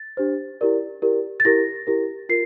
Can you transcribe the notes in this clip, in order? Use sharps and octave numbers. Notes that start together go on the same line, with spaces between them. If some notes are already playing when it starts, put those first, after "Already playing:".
Already playing: A6
D4 G4 C5
E4 G4 A#4 D5
E4 G4 A#4 D5
A6
E4 G4 A#4 A#6
E4 G4 A#4
F4 A#4 C7